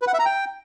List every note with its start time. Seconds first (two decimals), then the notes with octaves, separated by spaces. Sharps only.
0.02 B4
0.08 F#5
0.13 E5
0.19 A#5
0.25 G5